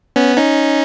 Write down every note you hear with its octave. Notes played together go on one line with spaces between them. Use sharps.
B3 C#4
C#4 D#4